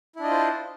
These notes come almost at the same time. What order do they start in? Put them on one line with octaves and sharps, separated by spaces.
E4 D4 D#5 F4 C5